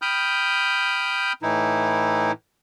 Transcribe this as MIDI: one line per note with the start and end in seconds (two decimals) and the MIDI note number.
0.02 1.33 79
0.02 1.33 83
0.02 1.33 87
0.02 1.33 89
0.02 1.33 91
1.43 2.32 45
1.43 2.32 52
1.43 2.32 63
1.43 2.32 64